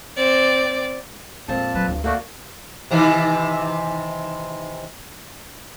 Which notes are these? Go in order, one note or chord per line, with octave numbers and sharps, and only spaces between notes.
C4 D5
F2 A#2 G#3 C4 A5
F#3 B3 B4 A5
D2 G2
A3 A#3 F#4 D5
C3 D#3 E3